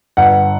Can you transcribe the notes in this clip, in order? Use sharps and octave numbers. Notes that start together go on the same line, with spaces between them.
G1 F#5